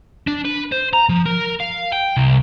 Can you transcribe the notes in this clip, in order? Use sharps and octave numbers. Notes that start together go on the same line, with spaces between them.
D4
B4
C5
A#5
F3
A#4
F5
G5
C2